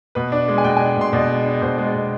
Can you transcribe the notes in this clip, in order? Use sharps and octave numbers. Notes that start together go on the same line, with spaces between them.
B2 B4
D4
G#3
G#5
B2 G5
G#5
D4
B2 C6
B2 D5
G#3
D4
B2 C5
G#3
D5
B2